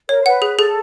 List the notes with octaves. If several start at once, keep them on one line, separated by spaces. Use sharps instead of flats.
A#4 C#5
C5
B4 F#5
G#4
G#4 A4